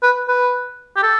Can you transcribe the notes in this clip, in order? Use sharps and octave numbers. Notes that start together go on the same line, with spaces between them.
B4
B4
G4
A4